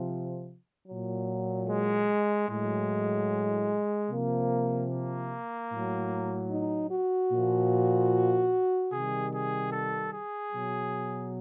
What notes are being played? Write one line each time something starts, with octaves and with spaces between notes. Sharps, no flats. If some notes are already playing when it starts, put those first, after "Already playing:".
Already playing: C3 F3
A#2 F#3
G#3
A2 F#3 G#3
C3 F3 A#3
A#3
A2 F#3
D#4
F#4
A#2 F3
C3 D#3 G3 G#4
G#4
A4
G#4
B2 F#3